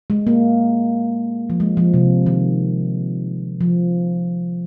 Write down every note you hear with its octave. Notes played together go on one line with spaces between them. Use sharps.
G#3
A#3
F3
G#3
F3
C3
D#3
F3